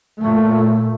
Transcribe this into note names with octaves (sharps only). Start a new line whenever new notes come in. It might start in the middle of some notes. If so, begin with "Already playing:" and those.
A#2 A3